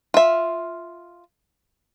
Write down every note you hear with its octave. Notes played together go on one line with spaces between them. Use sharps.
F4 E5